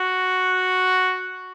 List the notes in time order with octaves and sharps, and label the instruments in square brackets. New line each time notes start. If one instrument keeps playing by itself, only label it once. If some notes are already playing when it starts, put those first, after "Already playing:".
Already playing: [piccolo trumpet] F#4